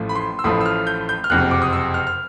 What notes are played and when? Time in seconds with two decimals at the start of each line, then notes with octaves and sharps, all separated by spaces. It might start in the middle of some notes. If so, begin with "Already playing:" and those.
Already playing: A1 A2 F3 A3
0.09 B5
0.15 C6
0.39 E6
0.44 A1 A2 F3 A3 D#6
0.61 E6
0.66 F6
0.87 G6
1.09 G6
1.24 F6
1.30 F#1 F2 C3 F#6
1.51 D6
1.62 D#6
1.73 E6
1.94 F6
2.07 F6